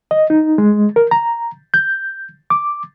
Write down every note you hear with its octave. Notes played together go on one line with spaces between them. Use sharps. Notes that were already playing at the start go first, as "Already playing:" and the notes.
D#5
D#4
G#3
A#4
A#5
G6
D6